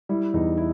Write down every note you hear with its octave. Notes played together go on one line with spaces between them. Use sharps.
G3 E4
E2 D#4
E4